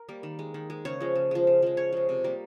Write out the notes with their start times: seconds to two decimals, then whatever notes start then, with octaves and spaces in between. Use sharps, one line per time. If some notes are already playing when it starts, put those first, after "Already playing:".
Already playing: A#4
0.09 G3 A#3
0.23 D#3
0.39 G#3
0.54 D#3
0.70 G#3
0.85 C#3 C#5
1.00 F3 G#3
1.15 C#3
1.31 F3 G#3
1.47 C#3
1.62 F3 G#3
1.77 C#3 C#5
1.92 F3 G#3
2.09 C3
2.24 G3 A#3